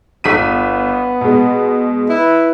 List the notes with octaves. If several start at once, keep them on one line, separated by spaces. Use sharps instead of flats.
G1 B3 B6 D#7
B2 G#3
E4 B4